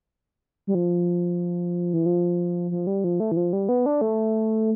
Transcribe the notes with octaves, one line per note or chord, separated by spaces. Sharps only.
G3
F3
E3
F3
F3
G3
F3
A3
E3
F3
G3
B3
D4
A3